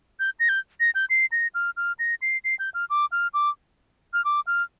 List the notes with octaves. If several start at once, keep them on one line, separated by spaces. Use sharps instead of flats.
G6
A#6
G6
A#6
G6
C7
A#6
F6
F6
A#6
C7
C7
G6
F6
D6
F6
D6
F6
D6
F6